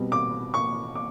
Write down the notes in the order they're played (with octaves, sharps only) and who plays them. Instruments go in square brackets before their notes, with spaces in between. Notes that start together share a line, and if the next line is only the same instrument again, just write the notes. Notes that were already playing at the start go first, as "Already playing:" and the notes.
Already playing: [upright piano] B2 G3 C4
D6
C#6
D6